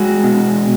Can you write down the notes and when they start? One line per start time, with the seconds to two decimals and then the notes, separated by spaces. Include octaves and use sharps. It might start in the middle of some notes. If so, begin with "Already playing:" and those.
Already playing: G#3 F#4
0.24 B2